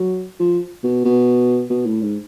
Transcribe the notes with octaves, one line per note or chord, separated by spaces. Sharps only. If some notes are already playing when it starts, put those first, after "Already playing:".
Already playing: F#3
F3
B2
B2
B2
A2
G#2